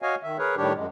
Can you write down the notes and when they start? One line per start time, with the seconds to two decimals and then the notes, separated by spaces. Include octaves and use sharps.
0.02 F#4 C#5 D#5 F5 G#5
0.23 D#3 E5
0.38 G#4 A#4 B4 C#5
0.57 A2 D#3 G3 D4 G4 C#5
0.75 F#2 G#3